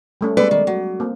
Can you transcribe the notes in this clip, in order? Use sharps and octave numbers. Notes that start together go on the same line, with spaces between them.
G3 A3 C#4
G3 G#3 B3 A4 B4 D5
D#3
F#3
A#3 C4